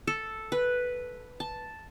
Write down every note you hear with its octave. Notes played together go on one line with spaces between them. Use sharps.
A4
B4
A5